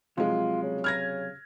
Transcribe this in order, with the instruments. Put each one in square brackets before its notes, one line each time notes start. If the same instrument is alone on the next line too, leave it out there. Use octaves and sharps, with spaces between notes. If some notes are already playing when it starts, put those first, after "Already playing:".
[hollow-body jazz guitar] C3 F#3 [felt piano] F3 G#3 [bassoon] F4
[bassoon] C#3
[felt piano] F6 G#6 A#6